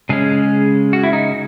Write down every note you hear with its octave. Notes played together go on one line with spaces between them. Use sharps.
C#3 G#3 C#4 G#4
F#4
E4
D#4